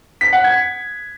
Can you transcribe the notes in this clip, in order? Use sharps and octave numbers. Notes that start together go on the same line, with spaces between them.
B6
F#5
G#6